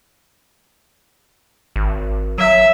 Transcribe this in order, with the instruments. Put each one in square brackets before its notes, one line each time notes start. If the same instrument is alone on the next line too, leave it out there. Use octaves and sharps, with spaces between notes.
[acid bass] G#1
[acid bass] F#3 [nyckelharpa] E5